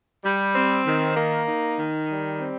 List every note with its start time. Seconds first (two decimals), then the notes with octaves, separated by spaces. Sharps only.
0.24 G3
0.55 C4
0.86 D#3
1.16 A#3
1.48 D#4
1.78 D#3
2.08 G3
2.39 C4